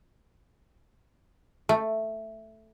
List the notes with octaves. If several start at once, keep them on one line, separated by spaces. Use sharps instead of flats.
A3